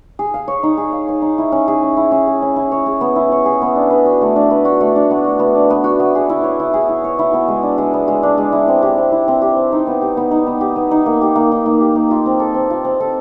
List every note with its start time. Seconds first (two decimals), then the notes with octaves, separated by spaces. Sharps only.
0.19 G#4
0.34 F5
0.48 C#5
0.63 D#4
0.77 G#4
0.92 F5
1.08 C#5
1.22 D#4
1.38 E4
1.52 C#4
1.68 G#4
1.83 C#4
1.97 E4
2.12 C#4
2.27 G#4
2.42 C#4
2.56 E4
2.72 C#5
2.86 G#4
3.01 B3
3.16 E4
3.32 C#5
3.46 G#4
3.62 B3
3.75 D4
3.90 B4
4.06 F#4
4.21 A3
4.36 D4
4.51 B4
4.65 F#4
4.81 A3
4.96 D4
5.11 B3
5.24 F#4
5.39 B3
5.55 D4
5.70 B3
5.84 F#4
6.00 B3
6.15 G#4
6.29 E4
6.44 C#5
6.60 E4
6.74 G#4
6.89 E4
7.04 C#5
7.19 E4
7.33 B3
7.48 G#3
7.63 D4
7.78 G#3
7.94 B3
8.08 G#3
8.23 D4
8.38 G#3
8.52 E4
8.68 C4
8.82 G4
8.98 C4
9.12 E4
9.28 C4
9.42 G4
9.57 C4
9.72 D#4
9.87 B3
10.02 G4
10.17 B3
10.31 D#4
10.47 B3
10.61 G4
10.76 B3
10.91 D#4
11.06 A#3
11.21 G4
11.36 A#3
11.51 D#4
11.66 A#3
11.81 G4
11.96 A#3
12.11 F4
12.26 C4
12.40 A4
12.54 C4
12.70 F4
12.85 C4
13.00 A4